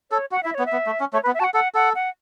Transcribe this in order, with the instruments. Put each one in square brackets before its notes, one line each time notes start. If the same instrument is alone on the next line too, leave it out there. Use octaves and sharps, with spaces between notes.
[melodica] A4 [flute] C#5
[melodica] F#4 [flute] F#5
[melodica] E4 [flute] E5
[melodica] B3 [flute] C#5
[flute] E5
[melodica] B3
A3
C#4
[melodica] A3 [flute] C#5
[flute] B4
[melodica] B3
[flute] E5
[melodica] F#4 [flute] A5
[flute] F#5
[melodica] A4 [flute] F#5
[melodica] A4 [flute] F#5
[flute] F#5